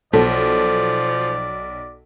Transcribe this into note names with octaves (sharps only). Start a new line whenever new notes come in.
B1 F3 A4 D5